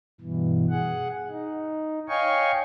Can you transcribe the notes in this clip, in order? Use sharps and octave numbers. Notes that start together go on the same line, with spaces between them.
G2 B2 E3
G#4 F#5
D#4
C#5 D#5 F5 G5 G#5 C#6